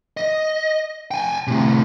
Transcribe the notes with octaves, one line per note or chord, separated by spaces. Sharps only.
D#5
G5 G#5
A2 C3